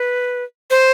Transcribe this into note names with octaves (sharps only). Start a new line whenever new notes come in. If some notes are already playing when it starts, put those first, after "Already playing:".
Already playing: B4
C5